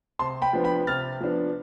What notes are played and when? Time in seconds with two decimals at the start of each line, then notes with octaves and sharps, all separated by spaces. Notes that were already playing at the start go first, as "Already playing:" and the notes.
0.19 C3 A5 C6
0.42 G5 B5
0.53 F3 B3 D4
0.64 G5 B5
0.87 C3 F6 A6
1.21 F3 B3 D4